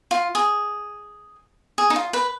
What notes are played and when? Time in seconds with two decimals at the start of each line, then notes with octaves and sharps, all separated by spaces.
0.11 F4
0.35 G#4
1.78 G#4
1.90 D#4
1.96 F4
2.13 B4